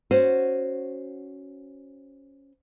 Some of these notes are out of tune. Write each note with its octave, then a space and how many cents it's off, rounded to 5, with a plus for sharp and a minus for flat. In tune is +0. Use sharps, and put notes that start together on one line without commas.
C#4 +0 F#4 +0 C5 +0